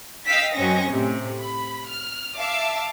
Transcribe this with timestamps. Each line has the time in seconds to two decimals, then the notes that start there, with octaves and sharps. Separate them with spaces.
0.26 D#5 F5 G5 E6 B6
0.56 F#2 F#3 C4 C#4 D#5 A#6
0.89 A2 C3
1.39 B5
1.88 F6
2.37 E5 F5 A5 D6 E6